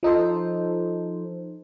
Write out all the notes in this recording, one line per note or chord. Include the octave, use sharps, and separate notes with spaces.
F3 D#4 A4 C5